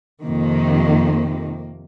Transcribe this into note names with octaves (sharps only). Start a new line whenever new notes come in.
F2 C3 D#3 A#3